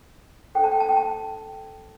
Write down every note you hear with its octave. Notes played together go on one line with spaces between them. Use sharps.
D4 A4 C5 G5
A5
G5
A5
G5
A5